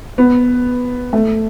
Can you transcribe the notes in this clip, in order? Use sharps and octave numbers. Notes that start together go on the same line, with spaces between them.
B3
A3